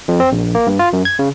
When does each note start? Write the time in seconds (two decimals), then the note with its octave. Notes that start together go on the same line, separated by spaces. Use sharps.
0.08 F2
0.20 C4
0.32 A#1
0.55 A#3
0.67 G2
0.79 F4
0.93 F#2
1.05 G#6
1.19 C#3